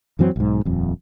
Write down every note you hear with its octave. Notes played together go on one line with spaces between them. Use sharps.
F#2 E3 F#3 C4
B1 G#2
D#1 F2